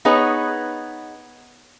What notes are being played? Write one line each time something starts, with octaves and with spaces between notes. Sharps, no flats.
B3 D#4 G#4 B4 C#5